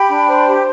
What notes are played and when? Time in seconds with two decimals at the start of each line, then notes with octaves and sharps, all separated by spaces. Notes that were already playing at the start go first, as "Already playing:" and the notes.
Already playing: G4 G5 B5
0.09 D4
0.28 C5
0.47 G4